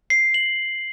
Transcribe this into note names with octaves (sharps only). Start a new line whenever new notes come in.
C7
F#7